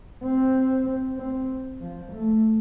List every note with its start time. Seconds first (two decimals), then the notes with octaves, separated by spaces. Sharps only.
0.24 C4
1.17 C4
1.81 F3
2.12 A3